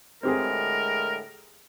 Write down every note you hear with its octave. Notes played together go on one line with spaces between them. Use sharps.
A2 D3 G#3 C4 G4 G#4 A#4